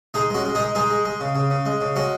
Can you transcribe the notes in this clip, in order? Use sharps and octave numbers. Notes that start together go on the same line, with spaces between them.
G#3 D#4 G#4
G#3 C#4 F#4
G#3
D#4 G#4
G#3
G#3 D#4 G#4
G#3
G#3
C#3
C#3
C#3
G#3
C#3
G#3 C#4 F#4